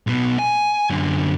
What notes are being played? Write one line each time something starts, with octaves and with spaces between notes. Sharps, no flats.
B1 B2
G#5
F#2 D3